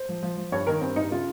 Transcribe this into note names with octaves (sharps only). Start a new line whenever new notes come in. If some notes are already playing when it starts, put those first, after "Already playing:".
Already playing: C5
F3
F3
F3
G2 C#5
D#3 A#4
G2 C4
G2 D#4
C#3 F4